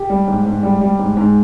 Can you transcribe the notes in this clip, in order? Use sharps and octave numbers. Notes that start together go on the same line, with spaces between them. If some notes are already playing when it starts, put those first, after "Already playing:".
Already playing: G4
G3
G#2
G#2
G3
G3
G#2
G#2